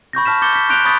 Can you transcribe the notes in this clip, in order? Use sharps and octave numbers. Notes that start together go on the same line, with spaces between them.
B5 C#6 G6 A#6
A5 F6 B6 E7
D6 G6 A6 C#7 G7
B6
C6 F#6 G6 D7 F7 G7
B5 C#6 D#6 G#6 A6 B6